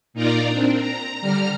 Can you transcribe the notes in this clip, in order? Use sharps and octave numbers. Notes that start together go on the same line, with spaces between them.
A#2 D#4 F4 A#4 D5 A#5
C4 D4
A#5
D3 G3 A#5 F6